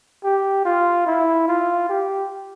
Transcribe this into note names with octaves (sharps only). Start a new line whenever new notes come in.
G4
F4
E4
F4
G4